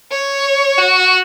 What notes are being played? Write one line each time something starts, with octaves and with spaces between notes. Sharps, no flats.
C#5
F#4